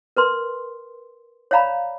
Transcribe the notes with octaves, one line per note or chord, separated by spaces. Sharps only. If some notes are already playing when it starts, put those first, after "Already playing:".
A#4 B4 C6
C#5 D5 F5 A#5 B5